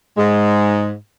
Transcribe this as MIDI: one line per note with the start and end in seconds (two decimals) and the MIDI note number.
0.17 0.93 44
0.17 0.93 56